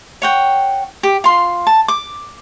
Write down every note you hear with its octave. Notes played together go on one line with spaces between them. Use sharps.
C#5 F#5 G5
G4
F4 C6
A5
D6